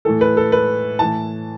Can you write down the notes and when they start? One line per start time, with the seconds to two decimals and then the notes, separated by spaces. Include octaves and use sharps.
0.05 A2 E3 A4
0.21 B4
0.37 A4
0.52 B4
0.99 A2 E3 A5